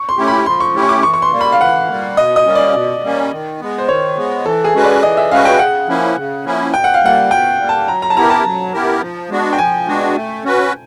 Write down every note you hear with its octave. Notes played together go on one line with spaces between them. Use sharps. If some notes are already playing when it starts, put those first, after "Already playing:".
Already playing: C#6
C6
A3 C#4 E4 G4
B5
F3 C6
C#6
A3 C#4 E4 G4
C#6
D6
E3 C#6
C#6
C6
G3 A#3
B5
F5
E3 F#5
G3 A#3
B2 D#5
D#5
G3 A#3 C#4
D5
B2
G3 A#3 C#4
D#3
G#3 B3
C5
D#3 C#5
G#3 B3
E3 A4
G#4
G#3 C#4 F#4 B4
D5
E3 D#5
E5
G#3 C#4 F#4 B4 F5
G5
C#3 F#5
F3 A#3 C#4 E4
C#3
F3 A#3 C#4 E4
B2 G5
F#5
F5
G3 A#3 F#5
B2 G5
G3 A#3
A5
F#3 A#5
A#5
A5
B3 E4 G4 A#4 A#5
A5
F#3
B3 E4 G4 A#4
F3
G#3 B3 D4 F#4
G5
F3 G#5
G#3 B3 D4 F#4
A3
C#4 F#4 B4